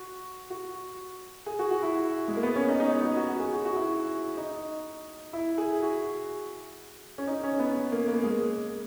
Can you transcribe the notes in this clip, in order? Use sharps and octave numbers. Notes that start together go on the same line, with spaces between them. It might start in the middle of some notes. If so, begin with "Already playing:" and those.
Already playing: F#4
F#4
G#4
F#4
F#4
E4
G#3
A#3
B3
C#4
D#4
D#4
D#4
F#4
F#4
F#4
G#4
F#4
F#4
E4
D#4
E4
G#4
F#4
C#4
D#4
C#4
B3
A#3
A#3
G#3